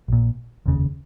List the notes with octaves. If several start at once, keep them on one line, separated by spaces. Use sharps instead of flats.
A#1 A#2
F1 D#2 C#3